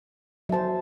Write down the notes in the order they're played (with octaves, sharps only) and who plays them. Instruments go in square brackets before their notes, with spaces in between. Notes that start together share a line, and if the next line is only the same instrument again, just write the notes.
[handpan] F#3 C5 [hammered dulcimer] E5 A5